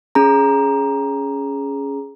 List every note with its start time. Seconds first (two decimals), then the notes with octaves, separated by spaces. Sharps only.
0.15 C#4 G#4 A#5